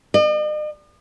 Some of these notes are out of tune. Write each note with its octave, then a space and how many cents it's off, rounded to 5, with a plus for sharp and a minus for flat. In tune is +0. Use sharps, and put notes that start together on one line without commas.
D#5 -45